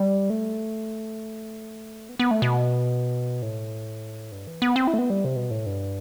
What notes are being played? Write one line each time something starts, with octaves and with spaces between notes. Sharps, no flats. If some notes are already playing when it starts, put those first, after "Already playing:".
Already playing: G3
A3
B3
B3
A3
B2
A2
G2
E3
B3
C4
E4
A3
B3
G3
C3
B2
A2
G2